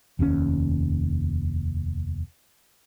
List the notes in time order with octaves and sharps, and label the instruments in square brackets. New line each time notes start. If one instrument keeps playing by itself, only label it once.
[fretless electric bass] F1 D#2 A2 C#4